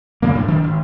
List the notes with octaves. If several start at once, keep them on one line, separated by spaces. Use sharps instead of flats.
C#3 A#3
G#2 D4
D#3 D4
G#1